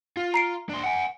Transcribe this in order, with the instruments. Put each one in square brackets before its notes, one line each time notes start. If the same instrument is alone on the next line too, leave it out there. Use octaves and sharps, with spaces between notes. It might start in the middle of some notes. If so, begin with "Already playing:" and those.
[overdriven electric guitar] F4
[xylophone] A#5 C7 D7
[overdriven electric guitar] D4 C5
F#5 G#5